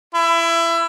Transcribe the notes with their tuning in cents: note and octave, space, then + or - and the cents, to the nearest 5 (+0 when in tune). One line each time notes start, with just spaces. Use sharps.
E4 +25